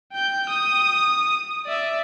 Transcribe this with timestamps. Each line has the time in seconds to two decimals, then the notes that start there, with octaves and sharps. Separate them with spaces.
0.13 G5 G6
0.50 D#6
1.66 D5 E5